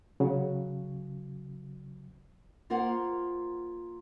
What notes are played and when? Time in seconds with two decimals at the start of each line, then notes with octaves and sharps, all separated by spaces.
0.20 C#3 F#3
2.70 A#3 F4 A#4 C5 F#5